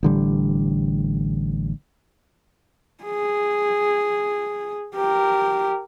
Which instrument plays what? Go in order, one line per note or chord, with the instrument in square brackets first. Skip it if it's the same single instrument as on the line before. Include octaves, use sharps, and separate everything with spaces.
[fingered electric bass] A1 D3 G3
[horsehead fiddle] G#4
G4 A#4